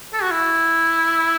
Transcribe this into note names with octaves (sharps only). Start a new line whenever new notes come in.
A4
F#4
E4